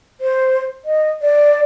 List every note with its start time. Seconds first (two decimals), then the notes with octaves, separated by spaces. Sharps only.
0.21 C5
0.85 D#5
1.22 D5